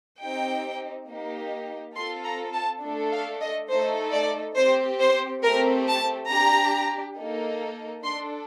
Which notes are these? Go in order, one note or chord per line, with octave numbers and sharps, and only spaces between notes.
C4 D#4 G4 G5
A#3 D#4 G4
C4 F4 A4 C6
A#5
A5
A3 D4 A4
F5
D#5
A3 D#4 A4 C5
D5
C4 G4 C5
C5
A3 C4 G4 A#4
A5
D4 G4 A#5
A#3 D#4 A4
D4 A4 C6